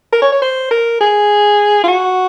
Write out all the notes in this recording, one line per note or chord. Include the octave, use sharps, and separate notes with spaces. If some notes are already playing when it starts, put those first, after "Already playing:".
A#4
C#5
C#5
C5
A#4
G#4
F4
F#4